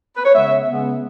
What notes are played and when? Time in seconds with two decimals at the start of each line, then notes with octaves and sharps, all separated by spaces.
0.16 B4
0.25 C#5
0.34 C#3 G#3 B3 E5
0.68 C#3 G#3 B3